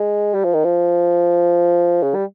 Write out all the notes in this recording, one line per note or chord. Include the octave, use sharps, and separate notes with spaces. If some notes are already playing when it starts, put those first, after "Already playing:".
Already playing: G#3
G3
F3
D#3
F3
C#3
G3